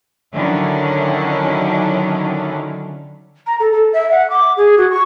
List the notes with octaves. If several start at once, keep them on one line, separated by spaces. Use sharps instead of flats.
D3 D#3 F#3 C#4 D4 E4
A#5
A4
A4
E5
F#5
D6
G#4
F#4
C#6